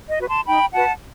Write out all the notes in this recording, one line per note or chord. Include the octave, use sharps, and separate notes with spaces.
D#5
F#4 B4
A5 C6
D#4 G5 B5
F#4 B4 F#5 A5